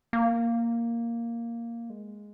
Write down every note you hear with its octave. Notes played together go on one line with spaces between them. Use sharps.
A#3
G#3